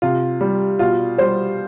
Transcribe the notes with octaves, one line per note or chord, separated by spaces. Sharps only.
C3 F4
G3
B2 F4
G3 C5